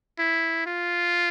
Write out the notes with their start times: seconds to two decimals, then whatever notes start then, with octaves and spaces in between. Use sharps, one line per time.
0.19 E4
0.67 F4